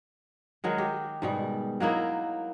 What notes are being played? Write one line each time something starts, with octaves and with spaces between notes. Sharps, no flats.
D#3 F#3 G#3
G4
G#2 B2 G3
F#3 A#3 D#4 E4